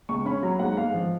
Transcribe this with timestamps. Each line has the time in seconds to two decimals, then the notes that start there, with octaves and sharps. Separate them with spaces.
0.09 C#2 C#6
0.25 C#4 B5
0.43 F#3 A#5
0.59 G#2 F#5
0.77 G#2 F5
0.94 F3